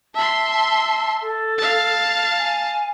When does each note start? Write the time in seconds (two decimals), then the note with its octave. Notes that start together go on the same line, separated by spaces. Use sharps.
0.15 E5 A5 C6
1.21 A4
1.58 F5 A5
2.38 G#5